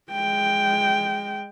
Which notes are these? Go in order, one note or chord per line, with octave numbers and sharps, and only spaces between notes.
G#3 G5